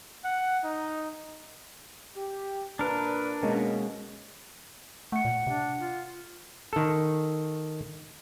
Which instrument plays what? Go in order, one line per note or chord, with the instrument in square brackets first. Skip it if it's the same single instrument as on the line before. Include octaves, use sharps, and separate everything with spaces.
[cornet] F#5
D#4
[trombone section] G4
[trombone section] A#2 B4 [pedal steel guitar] D4 A#4
[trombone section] B2 [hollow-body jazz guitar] G#3 A#3 C#4
[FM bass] A3 [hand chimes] F#5 C#7
[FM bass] A#2
[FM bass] C3 [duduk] D4
[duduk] F4
[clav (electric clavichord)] D#3 A4